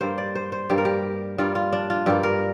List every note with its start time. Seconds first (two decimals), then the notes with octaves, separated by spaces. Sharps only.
0.01 G2 G3 A#3 C5
0.18 D5
0.35 C5
0.52 C5
0.70 G2 G3 A#3 G4
0.78 A#4
0.85 G4
1.38 G2 G3 A#3 F4
1.55 F4
1.73 D4
1.90 F4
2.06 G2 G3 A#3 G4
2.23 A#4